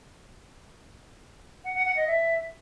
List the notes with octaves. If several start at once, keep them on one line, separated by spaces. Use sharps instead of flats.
F#5
F#5
F#5
D#5
E5